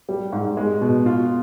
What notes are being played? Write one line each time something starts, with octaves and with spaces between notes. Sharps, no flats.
G3
G#2
G#3
B2
F4